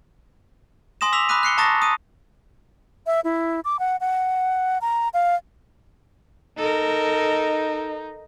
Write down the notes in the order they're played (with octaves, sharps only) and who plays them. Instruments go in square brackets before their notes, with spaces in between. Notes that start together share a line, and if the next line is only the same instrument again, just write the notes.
[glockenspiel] G#5 C6 D#6 A#6 E7
D6 E6 B6 F7
B5 D6 D#6 F#6 B6 D#7
F#6 C7 C#7 G7
A5 A#5 C#6 D#6 A6 A#6
D#6 D#7
[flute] E5
E4
D6
F#5
F#5
A#5
F5
[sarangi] D#4 [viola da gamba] A4 A#4